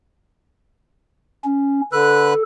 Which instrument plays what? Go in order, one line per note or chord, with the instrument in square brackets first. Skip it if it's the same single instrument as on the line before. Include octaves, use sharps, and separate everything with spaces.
[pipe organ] C#4
[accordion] D3 B4 F#6 [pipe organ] A4